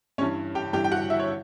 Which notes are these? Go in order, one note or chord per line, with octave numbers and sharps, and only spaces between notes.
G2 E3 G3 C#4 C#5
G4 G5
G2 E3 G3 G4 G5
G5
F#4 F#5
E4 E5
C#5